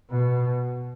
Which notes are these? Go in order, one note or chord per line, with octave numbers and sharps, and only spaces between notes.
B2